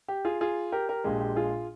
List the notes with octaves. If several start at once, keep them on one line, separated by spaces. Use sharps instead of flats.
G4
F4 G#4
F4 G#4
G4 A#4
G4 A#4
A#1 A#2 G#3 G4
G4
F4 G#4